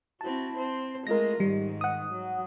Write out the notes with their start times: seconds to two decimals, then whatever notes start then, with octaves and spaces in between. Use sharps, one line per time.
0.21 C4 E4 F#4 A5
0.56 C4 C5
1.07 G#3 A3 F4 A#4 A#6
1.40 G#2 D#3 G3
1.81 F#5 D#6
2.12 F#3